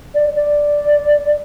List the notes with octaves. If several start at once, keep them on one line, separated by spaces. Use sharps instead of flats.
D5
D5